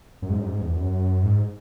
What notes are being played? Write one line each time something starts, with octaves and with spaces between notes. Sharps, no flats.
F#2
G#2
F#2
G#2
E2
F#2
G#2